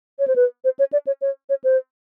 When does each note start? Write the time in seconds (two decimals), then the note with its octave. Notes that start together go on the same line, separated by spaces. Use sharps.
0.19 C#5
0.27 C5
0.36 B4
0.64 C5
0.79 C#5
0.92 D5
1.07 C#5
1.21 C#5
1.49 C#5
1.64 C5